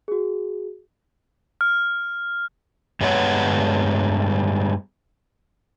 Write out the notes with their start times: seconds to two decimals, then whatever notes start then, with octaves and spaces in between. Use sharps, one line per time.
0.08 F#4 G#4
1.61 F6
3.01 G2 G3 G#3 B3 C#5 F#5